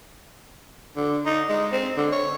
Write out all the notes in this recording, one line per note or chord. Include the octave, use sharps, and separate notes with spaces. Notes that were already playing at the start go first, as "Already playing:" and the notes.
D3
D#4
G#3
C4
D3
C#5